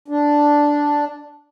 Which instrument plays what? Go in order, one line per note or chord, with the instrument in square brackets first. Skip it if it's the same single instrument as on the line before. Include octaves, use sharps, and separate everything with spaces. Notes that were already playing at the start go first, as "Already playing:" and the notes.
[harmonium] D4